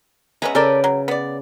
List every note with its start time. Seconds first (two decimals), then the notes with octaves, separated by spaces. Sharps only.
0.42 G#3 B3 C#4 B4 E5 A#5
0.55 C#3 A4 A#4 D5 G5
0.84 F#3
1.08 B3 D5